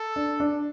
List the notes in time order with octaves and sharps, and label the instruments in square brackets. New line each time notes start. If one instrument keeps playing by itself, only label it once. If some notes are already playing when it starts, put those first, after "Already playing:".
Already playing: [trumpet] A4
[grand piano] D4
D4